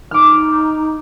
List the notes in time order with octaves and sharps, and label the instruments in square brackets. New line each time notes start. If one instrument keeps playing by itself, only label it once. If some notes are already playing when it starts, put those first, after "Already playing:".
[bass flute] D#4 [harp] D6 F6